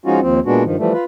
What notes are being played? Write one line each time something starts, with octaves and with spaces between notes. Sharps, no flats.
F3 G#3 C#4 D#4 F4 F#4
D#2 F3 C4
A#2 G#3 B3 D4 F#4
G2 D#3 F3
E3 F3 G3 A3
F4 B4